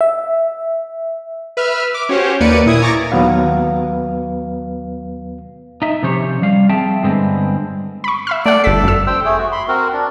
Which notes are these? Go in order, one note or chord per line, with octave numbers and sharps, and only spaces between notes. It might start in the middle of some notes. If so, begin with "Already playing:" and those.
E5
B4 E5 F6
D6
C#4 F#4 G4 C5 C#5
D#2 A#3 B4 D5 C#7 D#7
A#2 E4 D#6 G#6
G#5 A#5 C#6 D6 A6 A#6
D#2 F#3 B3 B4 F5
D#4 E5
C3 F3 C#4 G4 C5 C#5
F3 G3 F5
C4 G#4 E5 G5 A5
G2 D3 G#3 B3 C4
B5 C#6
E5 B5 F6
A3 D5 F#5
G1 A4 B6
F#2 E6
C5 G5 E6
A3 G#4
F#4
B5 C6
C4 F#4 A#4
D4